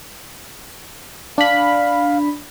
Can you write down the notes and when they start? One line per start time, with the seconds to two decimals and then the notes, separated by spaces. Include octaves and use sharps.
1.38 D4 F5 B5